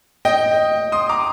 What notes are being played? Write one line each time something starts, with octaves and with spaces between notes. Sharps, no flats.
D#5 G5
C6 D#6
A#5 D6